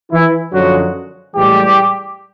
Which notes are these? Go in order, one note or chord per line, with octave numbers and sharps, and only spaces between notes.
E3 E4
F#2 D3 F3 F#3 G#3 F#4
A2 E3 G3 G#3 G4